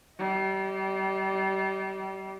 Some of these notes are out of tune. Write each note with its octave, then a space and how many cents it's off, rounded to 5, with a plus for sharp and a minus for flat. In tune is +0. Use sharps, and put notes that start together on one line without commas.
G3 -30 D#5 +30